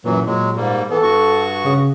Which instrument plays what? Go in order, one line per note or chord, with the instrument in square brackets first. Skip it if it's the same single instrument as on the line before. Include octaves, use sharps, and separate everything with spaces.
[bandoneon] F#2 E3 F#3 [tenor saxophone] A#2
[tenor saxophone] A#2 [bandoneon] F#3 G#3
[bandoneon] G#2 G3 A#3
[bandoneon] E3 B3 [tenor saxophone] A4
[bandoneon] G2 F#4 C#6
[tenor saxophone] C#3